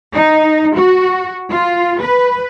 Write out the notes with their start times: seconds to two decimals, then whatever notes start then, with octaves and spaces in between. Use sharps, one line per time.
0.12 D#4
0.75 F#4
1.50 F4
2.01 B4